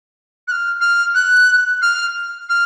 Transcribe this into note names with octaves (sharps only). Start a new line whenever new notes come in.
F#6
F6
F6
F#6
F6
F6